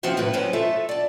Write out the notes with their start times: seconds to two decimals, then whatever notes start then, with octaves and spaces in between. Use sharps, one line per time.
0.03 D#2 F3 C4 F#4 C5 E5
0.17 A2 F3 B4
0.33 F#3 C#4 B4 C5
0.53 A3 F4 A4 E5
0.89 D5 A5